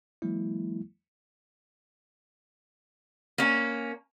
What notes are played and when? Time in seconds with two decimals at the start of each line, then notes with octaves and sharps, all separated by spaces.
0.22 E3 F#3 G#3 A#3 E4
3.38 A#3 C#4